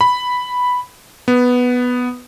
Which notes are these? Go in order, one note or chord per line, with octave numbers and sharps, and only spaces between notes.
B5
B3